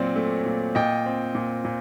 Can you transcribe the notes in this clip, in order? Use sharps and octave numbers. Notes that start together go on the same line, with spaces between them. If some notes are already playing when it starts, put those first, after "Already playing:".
Already playing: A#2 F#3 C4 D5
A3
A#2
A#2 D#5 G5
C4
A#2
A#2